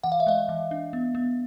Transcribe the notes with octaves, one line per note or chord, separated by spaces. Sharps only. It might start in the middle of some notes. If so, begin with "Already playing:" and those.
E3 F#5
F5
E5
G#3 D#5 F5
E3
D4
B3
B3